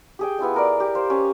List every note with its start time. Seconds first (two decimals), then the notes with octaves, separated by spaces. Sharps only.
0.19 G4 G#4 G5
0.39 B3 E4 F4 G#5
0.54 E4 A#4 D5
0.80 G4
0.95 C5 F5
1.10 C#4 G4